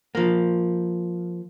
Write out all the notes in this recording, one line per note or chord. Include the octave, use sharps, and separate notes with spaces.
F3 A#3